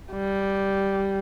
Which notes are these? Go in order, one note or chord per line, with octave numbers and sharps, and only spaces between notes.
G3